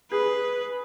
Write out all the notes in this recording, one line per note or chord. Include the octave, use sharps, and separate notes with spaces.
G#4 B4